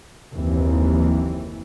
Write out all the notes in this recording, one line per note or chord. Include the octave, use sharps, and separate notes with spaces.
F#1 D#2 E3 C4